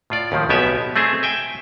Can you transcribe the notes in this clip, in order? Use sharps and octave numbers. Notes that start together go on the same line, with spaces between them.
A2 F4 D5
D#2 A2 D#3 F3
B1 B2 B3 G4 E5 G#5
A3 C4 G#4 E5
E5 G5 G#5